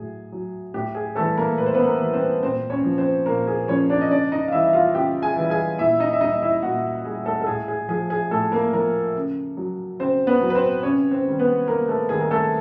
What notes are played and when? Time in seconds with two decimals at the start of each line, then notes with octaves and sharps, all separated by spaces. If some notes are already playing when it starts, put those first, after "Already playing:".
Already playing: A2 F#3 G#4
0.32 F#3
0.74 A2 G4
0.95 G#4
1.15 E3 G3 A3 A4
1.37 A#3 A#4
1.58 A2 B4
1.66 C5
1.74 B3 B4
1.86 A#3 A#4
2.00 E3 G3
2.14 C4 C5
2.43 A#2 C4 C5
2.70 C#4 C#5
2.84 F3
2.98 C4 C5
3.26 A#2 A#3 A#4
3.47 G#4
3.68 F3 C#4 C#5
3.90 D4 D5
4.01 D#5
4.10 C#3 D4 D5
4.32 D#4 D#5
4.48 F5
4.52 E3 G3 E4 E5
4.64 E5
4.73 F4 F5
4.95 C#3 G4 G5
5.22 G#4 G#5
5.37 E3 G3
5.50 G#4 G#5
5.78 A#2 E4 E5
6.00 D#4 D#5
6.13 E5
6.21 G3 D#4 D#5
6.42 E4 E5
6.62 A#2 F#4 F#5
7.04 G3 G#4
7.26 A3 A4
7.42 A4
7.47 A2 G#4
7.68 G#4
7.88 F3 G#4
8.10 G#4
8.31 A2 A3 A4
8.52 A#3 A#4
8.73 F3 A#3 A#4
9.15 C#3
9.57 F#3
9.99 C#3 C4 C5
10.27 B3 B4
10.41 F#3
10.50 B4
10.55 C4 C5
10.83 C3 C#4 C#5
11.11 C4 C5
11.25 D#3 G3
11.39 B3 B4
11.68 C3 A#3 A#4
11.88 A3 A4
12.09 D#3 G3 G#4
12.21 A#4
12.31 A3 A4